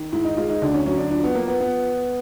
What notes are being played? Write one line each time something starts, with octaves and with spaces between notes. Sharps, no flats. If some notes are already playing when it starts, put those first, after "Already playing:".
Already playing: D#3
G#2 E4
D#4
G#3 F4
D#4
D2 D4
C#4
F#3 C#4
D4
F3 D4
B3
F3 A#3
B3
B3